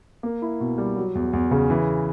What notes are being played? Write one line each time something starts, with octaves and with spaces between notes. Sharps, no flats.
A#3
E4
B2
G3
F#3
E2
E2
C#3
E3